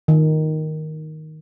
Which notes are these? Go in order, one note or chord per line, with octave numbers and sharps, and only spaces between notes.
D#3